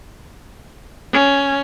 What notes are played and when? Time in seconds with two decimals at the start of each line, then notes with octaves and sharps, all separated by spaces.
1.13 C#4